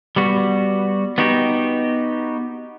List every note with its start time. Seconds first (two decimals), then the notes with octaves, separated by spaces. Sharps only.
0.16 G3 B3 F#4
1.18 B3 D#4 F#4 G4